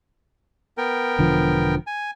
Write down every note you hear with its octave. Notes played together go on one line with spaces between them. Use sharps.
B3 A#4 G5
E1 D3 F3
G#5